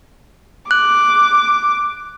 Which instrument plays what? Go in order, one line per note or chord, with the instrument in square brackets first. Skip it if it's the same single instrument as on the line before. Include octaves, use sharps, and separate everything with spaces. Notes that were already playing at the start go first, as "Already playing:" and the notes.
[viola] D6 [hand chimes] F#6